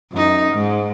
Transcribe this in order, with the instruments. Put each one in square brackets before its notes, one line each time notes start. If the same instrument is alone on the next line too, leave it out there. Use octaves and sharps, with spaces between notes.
[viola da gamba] F#2 D#4
G#2